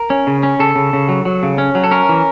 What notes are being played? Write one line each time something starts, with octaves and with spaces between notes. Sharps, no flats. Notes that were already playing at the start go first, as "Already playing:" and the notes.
Already playing: A#4
C#4
C#3
C#4
C#3 A4
C#3
C#3
F#3
F#3
C#3
C#4
F#3
A4
C#4 A#4
E3